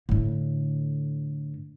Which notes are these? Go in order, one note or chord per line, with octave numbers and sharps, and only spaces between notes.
A2 D3